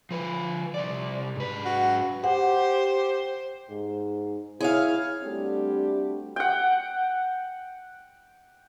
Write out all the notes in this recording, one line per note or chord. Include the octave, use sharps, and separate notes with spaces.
F3 B4
C2 D5
G#2 B4
F#4
G4 C5 F#5
G#2
E4 G#4 C#5 F5
G3 A3 C4 D4 F#4 G4
F#5 G5